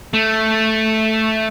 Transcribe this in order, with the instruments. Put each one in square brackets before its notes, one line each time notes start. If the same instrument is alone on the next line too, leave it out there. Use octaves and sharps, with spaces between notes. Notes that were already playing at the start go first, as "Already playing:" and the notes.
[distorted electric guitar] A3